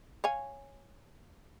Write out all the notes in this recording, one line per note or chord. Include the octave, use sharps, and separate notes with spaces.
C#5 F5 G#5